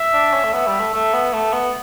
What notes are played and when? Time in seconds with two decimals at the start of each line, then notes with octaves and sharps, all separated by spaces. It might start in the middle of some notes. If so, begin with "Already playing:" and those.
Already playing: E5
0.13 D4
0.33 C#4
0.44 A3
0.53 B3 E5
0.67 G3
0.80 A3
0.94 A3
1.14 B3
1.33 A3
1.53 B3